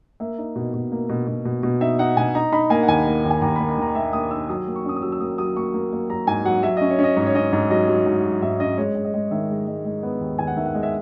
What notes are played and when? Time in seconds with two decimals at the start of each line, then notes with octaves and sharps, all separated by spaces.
0.20 A#3 E5
0.38 D#4
0.56 B2
0.74 B2
0.92 A#3
1.09 B2
1.27 B2
1.45 B2
1.63 B2
1.81 D#4 E5
1.99 D#4 F#5
2.17 B2 G#5
2.35 D#4 A#5
2.52 D#4 B5
2.70 A#3 G#5
2.83 F#5
2.88 D#2 G#5
3.06 A#3
3.24 D#2
3.30 G#5
3.42 D#2 A#5
3.56 B5
3.60 A#3
3.69 B5
3.78 D#3 A#5
3.95 A#3 E5
4.13 A#3 D#6
4.31 D#4 E6
4.49 F#3 D#6
4.67 A#3
4.76 C#6
4.85 C#4 D#6
4.96 D#6
5.02 F#3 E6
5.12 E6
5.20 A#3 D#6
5.38 F#3 D#6
5.56 A#3 C#6
5.74 A#3
5.92 A#3
6.10 F#3 A#5
6.27 G#2 G#5
6.45 F#3 F#5
6.63 F#3 E5
6.77 C#4 D#5
6.90 C#5
6.99 C#4 D#5
7.17 G#2 C#5
7.27 C#5
7.35 C#4 D#5
7.53 G#2 C#5
7.71 F#3 D#5
7.88 F#3
8.06 G#2
8.24 F#3
8.42 G#2 E5
8.60 C#4 D#5
8.78 G#3 C#5
8.95 G#3
9.04 D#5
9.14 G#3
9.31 D#3 E5
9.49 G#3
9.67 G#3
9.85 G#3
10.03 B3
10.21 D#2
10.39 D#2 G#5
10.47 F#5
10.56 D#3 E5
10.66 F#5
10.74 G#3
10.83 E5